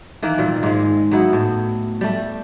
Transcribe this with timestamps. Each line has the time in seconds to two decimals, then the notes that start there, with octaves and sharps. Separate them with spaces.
0.23 D#3 E3 A#3
0.38 A#2 G3
0.63 G#2 G#3
1.11 F#3 B3 D#4 E4
1.33 A2
2.01 G3 A3